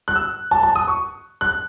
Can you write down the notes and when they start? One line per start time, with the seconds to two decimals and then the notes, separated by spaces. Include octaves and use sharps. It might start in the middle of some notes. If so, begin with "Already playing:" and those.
0.08 F#6
0.15 E6
0.51 A5
0.63 A5
0.75 D#6
0.88 C#6
1.41 F#6